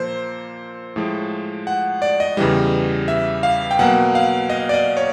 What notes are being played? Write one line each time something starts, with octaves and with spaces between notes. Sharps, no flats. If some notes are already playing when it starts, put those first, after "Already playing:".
Already playing: A#2 F3 A#3 C5
A2 F3 G#3
F#5
D5
D#5
E2 C#3 E3 G3
E5
F5
G5
B2 F#3 A#3 F#5
F5
D#5
D5
D#5
C#5